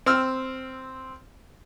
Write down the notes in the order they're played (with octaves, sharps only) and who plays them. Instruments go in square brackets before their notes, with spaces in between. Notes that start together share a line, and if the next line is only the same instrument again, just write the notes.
[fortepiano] C4 E6 F6